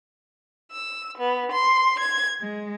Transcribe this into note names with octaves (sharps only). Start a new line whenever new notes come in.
E6
B3
C6
G#6
G#3